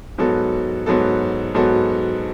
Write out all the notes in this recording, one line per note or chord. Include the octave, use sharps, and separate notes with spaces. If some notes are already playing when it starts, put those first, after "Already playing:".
G#2 F#3 B3 F#4 A4
G#2 F#3 B3 F#4 A4
G#2 F#3 B3 F#4 A4